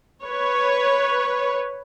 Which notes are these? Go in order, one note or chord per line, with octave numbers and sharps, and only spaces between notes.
B4 C#5